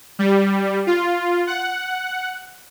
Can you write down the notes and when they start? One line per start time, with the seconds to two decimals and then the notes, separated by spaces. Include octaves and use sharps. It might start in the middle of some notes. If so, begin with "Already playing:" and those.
0.19 G3
0.87 F4
1.47 F#5